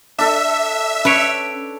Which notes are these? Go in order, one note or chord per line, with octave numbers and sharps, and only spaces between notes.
D4 A4 E5
C#4 B4 C#5 D7